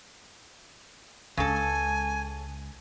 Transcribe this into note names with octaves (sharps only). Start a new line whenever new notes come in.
C#2 C#3 G#3 A4 G#5